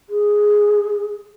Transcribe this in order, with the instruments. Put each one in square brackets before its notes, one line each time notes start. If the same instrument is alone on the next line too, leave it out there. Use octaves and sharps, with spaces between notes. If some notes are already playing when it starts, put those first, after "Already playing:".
[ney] G#4